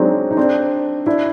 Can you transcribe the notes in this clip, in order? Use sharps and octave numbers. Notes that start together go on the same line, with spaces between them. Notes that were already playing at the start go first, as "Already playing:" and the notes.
Already playing: F#3 G#3 C4 D4 D#4
D#4
C4 D4
D4 E4